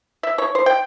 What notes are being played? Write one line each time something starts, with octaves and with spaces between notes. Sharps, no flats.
E5
C#5
C5
G5